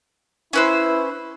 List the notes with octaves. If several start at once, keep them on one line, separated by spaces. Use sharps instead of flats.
C#4 E4 B4 C5